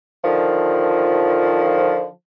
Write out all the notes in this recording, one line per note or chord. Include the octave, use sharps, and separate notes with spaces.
D3 D#3 F3